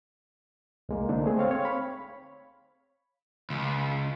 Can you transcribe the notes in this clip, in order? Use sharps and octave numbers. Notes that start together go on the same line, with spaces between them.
C2 G#3 A#3
D3 A#3 C4 D4 D#4
A3 C4 G#4
C4 C#5 F5
C#5 F5
B5
C#2